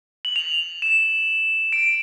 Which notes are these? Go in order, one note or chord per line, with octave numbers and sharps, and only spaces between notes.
F#7
F7
E7
D7